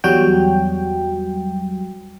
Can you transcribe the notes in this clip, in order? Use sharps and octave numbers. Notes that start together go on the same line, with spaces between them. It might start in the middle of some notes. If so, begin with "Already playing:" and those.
E2 F#3 G3 F#4 G5